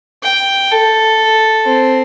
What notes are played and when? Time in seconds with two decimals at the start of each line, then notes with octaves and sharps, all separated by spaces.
0.23 G5
0.71 A4
1.65 C4